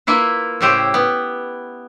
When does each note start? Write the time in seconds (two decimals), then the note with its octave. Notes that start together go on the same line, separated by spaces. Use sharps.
0.07 A#3 E4 F4 B4
0.61 A2 C#3 E4 G4 C5 G5
0.94 B3